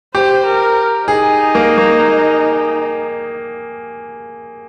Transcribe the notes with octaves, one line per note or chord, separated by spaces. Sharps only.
G4 C5
A#4
D#4 G#4
A#3
A#3